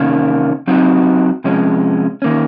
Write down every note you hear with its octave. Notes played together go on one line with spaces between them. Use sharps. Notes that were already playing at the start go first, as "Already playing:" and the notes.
Already playing: C3 D#3 A#3 C#4
F#3 C4 D#4 F#4
C3 F3 G#3 C#4
D#3 A#3 C#4